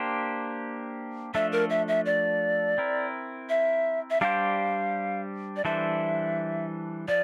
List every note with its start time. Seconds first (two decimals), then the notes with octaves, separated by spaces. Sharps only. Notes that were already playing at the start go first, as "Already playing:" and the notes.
Already playing: A#3 D4 G4 C5
1.34 F3 A3 D4 A4 E5
1.52 A#4
1.70 E5
1.88 E5
2.06 D5
2.78 C4 E4 A#4
3.49 E5
4.10 E5
4.21 G3 D4 G4 C5 F5
5.56 D5
5.65 E3 G3 D4 A4 C5 E5
7.08 F3 D5